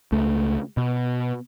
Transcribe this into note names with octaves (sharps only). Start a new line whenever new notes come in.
C#2 A3
B2